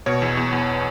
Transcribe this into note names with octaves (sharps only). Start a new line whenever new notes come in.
B2 C#5
E2
E2
E2